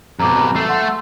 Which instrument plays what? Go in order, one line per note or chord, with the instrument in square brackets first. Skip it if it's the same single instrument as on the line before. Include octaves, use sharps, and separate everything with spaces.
[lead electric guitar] F2 B2 [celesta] A#5 D6
[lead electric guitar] A3 A4 [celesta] C7
[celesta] F#5 C6